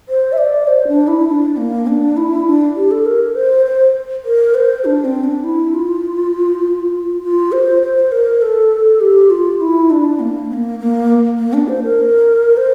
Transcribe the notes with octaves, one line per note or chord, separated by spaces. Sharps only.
C5
E5
D5
C5
D4
E4
D4
A#3
D4
E4
D4
G4
A4
A#4
C5
C5
A#4
C5
D4
C4
D4
E4
F4
F4
C5
C5
A#4
A4
G4
F4
E4
D4
A#3
C4
A#3
A#3
A#3
D4
C5
A#4
C5